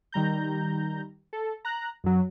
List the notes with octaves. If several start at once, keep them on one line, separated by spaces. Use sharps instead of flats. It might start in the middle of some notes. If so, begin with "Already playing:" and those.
D#3 G3 A#5 G6
A4
A#5 F#6
F#2 F#3